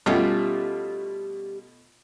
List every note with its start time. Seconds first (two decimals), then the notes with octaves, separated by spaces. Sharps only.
0.06 B2 G3 A3 C#4 F4 G4